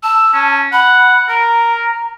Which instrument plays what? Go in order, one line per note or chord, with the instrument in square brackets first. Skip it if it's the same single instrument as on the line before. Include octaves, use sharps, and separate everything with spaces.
[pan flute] A5 [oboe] E6
[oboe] C#4
[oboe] F#5 [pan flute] B5
[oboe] A#4 [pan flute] A#5